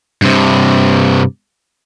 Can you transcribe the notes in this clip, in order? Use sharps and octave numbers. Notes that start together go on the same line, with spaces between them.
G2 C3